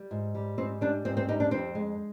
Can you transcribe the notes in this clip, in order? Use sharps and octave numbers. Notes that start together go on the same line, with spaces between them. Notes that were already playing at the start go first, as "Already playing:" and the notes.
Already playing: G3
G#2
G3
G#2 C4
G3 D4
G#2 C4
C4
G3 D#4
D4
F2 C4
G#3